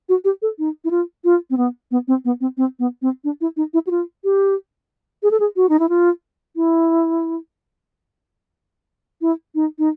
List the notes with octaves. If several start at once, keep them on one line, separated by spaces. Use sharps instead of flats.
F#4
G4
A4
D#4
E4
F4
F4
C4
B3
B3
C4
B3
C4
C4
B3
C4
D4
E4
D#4
E4
F#4
F4
G4
G#4
A4
G#4
F#4
D#4
E4
F4
E4
E4
D#4
D#4